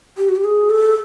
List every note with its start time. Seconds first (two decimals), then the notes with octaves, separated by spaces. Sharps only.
0.18 G4
0.29 F#4
0.36 G4
0.44 G#4
0.70 A4